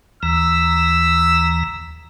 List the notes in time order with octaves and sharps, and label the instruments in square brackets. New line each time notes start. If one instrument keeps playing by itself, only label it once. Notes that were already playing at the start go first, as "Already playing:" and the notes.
[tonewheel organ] D#2 E3 A#5 [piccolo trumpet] E6